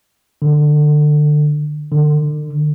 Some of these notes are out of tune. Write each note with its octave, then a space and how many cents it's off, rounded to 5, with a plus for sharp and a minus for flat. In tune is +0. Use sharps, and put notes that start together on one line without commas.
D3 +25
D3 +40